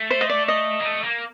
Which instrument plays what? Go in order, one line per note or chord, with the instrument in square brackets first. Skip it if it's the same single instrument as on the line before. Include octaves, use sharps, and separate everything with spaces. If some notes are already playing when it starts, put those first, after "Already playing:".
Already playing: [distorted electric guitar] A3
[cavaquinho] C5
D#5
D5
D#5
[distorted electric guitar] A#3
A3
A#3